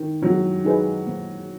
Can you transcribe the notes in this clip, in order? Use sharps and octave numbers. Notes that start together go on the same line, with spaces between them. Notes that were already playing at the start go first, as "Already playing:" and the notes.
Already playing: D#3
F#3 A#3
D#4 G#4 B4
A#3